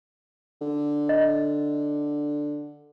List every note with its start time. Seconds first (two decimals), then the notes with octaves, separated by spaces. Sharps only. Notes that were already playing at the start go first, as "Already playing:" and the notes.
0.61 D3
1.09 D#5